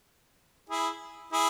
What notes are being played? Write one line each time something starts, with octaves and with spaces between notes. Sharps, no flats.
E4 G#4
E4 G#4